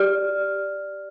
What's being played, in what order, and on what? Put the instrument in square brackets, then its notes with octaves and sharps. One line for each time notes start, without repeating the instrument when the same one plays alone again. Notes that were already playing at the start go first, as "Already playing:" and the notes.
Already playing: [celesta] G4 D5 F6